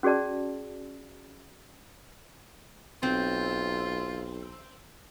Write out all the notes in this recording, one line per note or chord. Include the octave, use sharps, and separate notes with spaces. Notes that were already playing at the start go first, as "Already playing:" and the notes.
C#4 F#4 G#4 D5 A5
B1 C4 F4